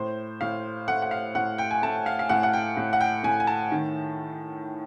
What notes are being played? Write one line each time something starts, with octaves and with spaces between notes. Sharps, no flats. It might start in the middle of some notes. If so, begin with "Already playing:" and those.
Already playing: A2 C5
A2 F5
A3 F#5
F#5
F5
A2 F#5
G5
G#5
A3 A5
F5
F5
A2 F#5
F#5
G5
A2
F#5
G5
A2 G#5
G#5
A5
D#3